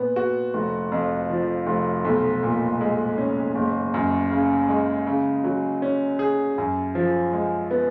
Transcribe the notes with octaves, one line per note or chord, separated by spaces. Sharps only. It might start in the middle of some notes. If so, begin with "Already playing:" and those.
Already playing: A#2 B3
F#4
F1
F2
F3
F1
B1
A#2
G#3
C#4
F#1
F#2
C#3
G#3
C#3
F#3
C#4
G#4
F#2
F3
G#3
B3